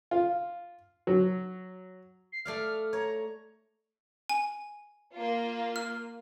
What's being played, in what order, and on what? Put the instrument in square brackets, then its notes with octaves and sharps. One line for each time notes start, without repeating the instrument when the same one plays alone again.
[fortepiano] F4
F#3
[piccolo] C7
[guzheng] A3 D5 F5 [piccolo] F6
[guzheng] C#5 [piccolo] A#5
[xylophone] G#5
[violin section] A#3 F4
[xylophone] F6